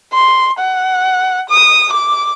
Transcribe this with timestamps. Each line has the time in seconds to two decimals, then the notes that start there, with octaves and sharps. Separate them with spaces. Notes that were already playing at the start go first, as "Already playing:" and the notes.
0.14 C6
0.59 F#5
1.49 D#6
1.93 D6